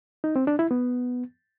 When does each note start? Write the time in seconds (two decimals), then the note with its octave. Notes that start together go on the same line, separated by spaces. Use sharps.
0.24 D#4
0.36 C4
0.47 D4
0.59 E4
0.71 B3